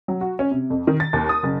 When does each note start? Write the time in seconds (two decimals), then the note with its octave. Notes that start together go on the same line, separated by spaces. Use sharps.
0.08 F#3
0.21 F#4
0.39 C#4
0.51 C3
0.70 F2
0.87 D#3
1.00 A6
1.13 D#2
1.29 D#6
1.43 F#1